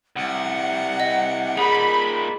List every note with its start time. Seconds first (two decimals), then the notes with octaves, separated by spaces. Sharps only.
0.16 C2 F#5
1.00 D#5
1.57 A#2 D#4 G#4 B5